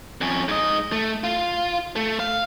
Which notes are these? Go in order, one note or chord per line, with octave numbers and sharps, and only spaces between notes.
F2 C#4
G#2 D#5
A3
F4
A3
F5